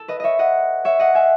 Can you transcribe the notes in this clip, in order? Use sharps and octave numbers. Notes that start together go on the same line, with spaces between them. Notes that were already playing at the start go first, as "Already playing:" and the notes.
Already playing: A4
B4 D#5
C#5 D#5 E5
D#5 F#5
C#5 E5
D#5 F#5
E5 G#5